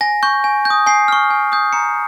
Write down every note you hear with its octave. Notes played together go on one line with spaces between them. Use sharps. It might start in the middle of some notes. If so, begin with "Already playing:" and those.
G#5 A#6
C#6 G6
G#5
G6
D#6
G#5 C7
C#6 F6
G#5
D#6 G6
A#5 C#7